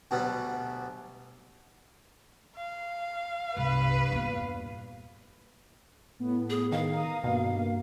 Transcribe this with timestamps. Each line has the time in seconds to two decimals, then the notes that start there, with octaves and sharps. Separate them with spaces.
0.11 D2 B2 F#3 G3 B3
2.56 F5
3.57 C2 G2 B2 B4
4.12 E2 A#2
6.19 A2 B3
6.50 G#4
6.72 D#3 F5
6.93 A#5 D#6
7.24 G2 B2 A#3